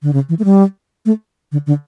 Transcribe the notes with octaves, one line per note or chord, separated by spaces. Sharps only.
D3
C#3
E3
A3
G3
A3
D3
D3